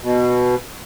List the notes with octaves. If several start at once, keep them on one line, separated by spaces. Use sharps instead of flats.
B2